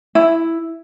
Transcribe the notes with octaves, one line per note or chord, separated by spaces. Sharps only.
E4